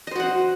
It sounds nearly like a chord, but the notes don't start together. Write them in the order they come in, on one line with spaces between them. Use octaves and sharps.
D#5 C5 F#4 F#5